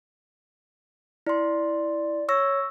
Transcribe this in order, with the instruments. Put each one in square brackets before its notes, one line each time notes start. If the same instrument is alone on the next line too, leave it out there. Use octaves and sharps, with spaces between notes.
[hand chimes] E4 C6 [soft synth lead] D5
[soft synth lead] C#5 [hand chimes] C#6 E6 A#6